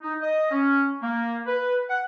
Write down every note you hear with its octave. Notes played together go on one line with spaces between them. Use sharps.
D#4
D#5
C#4
A#3
B4
F#5